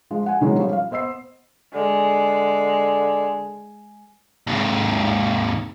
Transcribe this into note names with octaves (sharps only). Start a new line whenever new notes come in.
F3 G#3
F#5 G#5
B2 D#3 E3 F#3 G#3 C#4
F3 G3 C#4
F5
B3 C5 D#5 E6 C7
D3 G#3
D#2 G#2